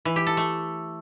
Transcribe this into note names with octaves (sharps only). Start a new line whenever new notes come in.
E3
G4
A4
A3